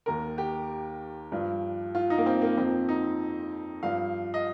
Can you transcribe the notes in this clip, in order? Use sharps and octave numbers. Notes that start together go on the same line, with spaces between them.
D#2 D#3 A#4
G4
G2 F3
F4
D#4
A#3
C4
A#3
F2 F3 C4
D#4
G2 F3 F5
D#5